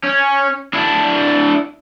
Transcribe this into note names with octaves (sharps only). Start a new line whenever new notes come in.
C#4
D4 E4